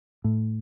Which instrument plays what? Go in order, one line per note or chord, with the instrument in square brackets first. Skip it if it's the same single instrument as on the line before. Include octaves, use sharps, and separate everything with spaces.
[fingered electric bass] A2